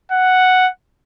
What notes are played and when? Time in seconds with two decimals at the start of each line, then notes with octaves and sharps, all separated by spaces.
0.12 F#5